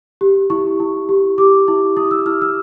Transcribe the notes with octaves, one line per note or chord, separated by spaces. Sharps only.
G4
E4 C#6
E4
G4
G4 D6
E4
E4 D#6
E6
E4 F6
E6